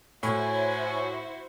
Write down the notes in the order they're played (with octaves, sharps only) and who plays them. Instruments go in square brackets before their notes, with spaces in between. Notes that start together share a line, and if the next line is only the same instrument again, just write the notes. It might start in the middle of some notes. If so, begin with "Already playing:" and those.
[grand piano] A2 [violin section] E4 F#4 C5 [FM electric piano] C#5 [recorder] G#5